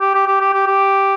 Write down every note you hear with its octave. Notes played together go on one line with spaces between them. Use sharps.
G4
G4
G4
G4
G4
G4